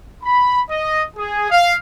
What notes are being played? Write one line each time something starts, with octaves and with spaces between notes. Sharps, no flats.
B5
D#5
G#4
F5